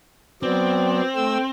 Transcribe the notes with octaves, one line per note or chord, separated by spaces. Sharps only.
F#3 B3 C4 D5
A3 E6